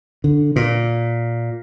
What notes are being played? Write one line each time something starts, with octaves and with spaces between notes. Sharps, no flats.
D3
A#2